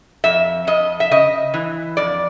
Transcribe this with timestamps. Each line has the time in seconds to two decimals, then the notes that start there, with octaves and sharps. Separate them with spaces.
0.24 F2 E5
0.67 F2 D#5
1.00 E5
1.11 C#3 D#5
1.54 E3
1.97 F2 D5